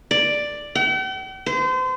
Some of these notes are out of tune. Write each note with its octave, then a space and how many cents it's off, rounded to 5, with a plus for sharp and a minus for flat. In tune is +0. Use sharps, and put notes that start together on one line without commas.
D5 +5
G5 -45
C5 -35